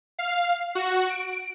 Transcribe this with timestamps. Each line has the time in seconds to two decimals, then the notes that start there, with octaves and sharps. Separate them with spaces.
0.19 F5
0.75 F#4
1.10 D7